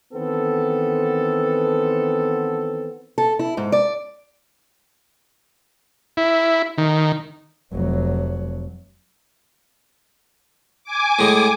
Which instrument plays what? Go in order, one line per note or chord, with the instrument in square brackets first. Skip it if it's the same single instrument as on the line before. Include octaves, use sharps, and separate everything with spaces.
[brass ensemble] D#3 E3 B3 C4 A4
[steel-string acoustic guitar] A4
E4
G#2
D5
[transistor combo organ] E4
D#3
[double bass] F1 F#3
[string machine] G#5 D6
[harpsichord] A2 G#3